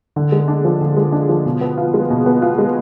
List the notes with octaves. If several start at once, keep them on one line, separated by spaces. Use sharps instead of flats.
D3
G#3
D4
F3
D3
G#3
D4
F3
B2
B3
F4
G#3
B2
B3
F4
G#3